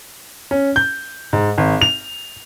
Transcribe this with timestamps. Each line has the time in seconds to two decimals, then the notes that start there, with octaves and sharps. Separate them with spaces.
0.51 C#4
0.76 G6
1.33 G#2
1.58 G#1
1.82 F7